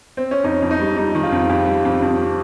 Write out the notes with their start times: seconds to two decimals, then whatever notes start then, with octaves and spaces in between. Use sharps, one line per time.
0.17 C4
0.31 C#4
0.44 F2 D#4
0.62 F2
0.71 D#4
0.80 G3
0.97 G3 D#4
1.15 D#3
1.23 F4
1.32 F2
1.49 F2 G4
1.67 G3
1.85 F2
2.02 F2